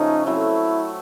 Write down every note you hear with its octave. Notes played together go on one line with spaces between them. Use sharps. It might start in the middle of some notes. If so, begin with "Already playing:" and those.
Already playing: C#3 F3 A3 C#4 D#4
F#3 A3 C4 E4